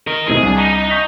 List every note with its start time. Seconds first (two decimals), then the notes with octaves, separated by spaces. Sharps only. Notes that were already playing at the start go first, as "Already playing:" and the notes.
0.07 A#4 D#5
0.28 A2 C3 D#3 G#4
0.42 C2 D4
0.58 D#4
0.91 C#6 G6 B6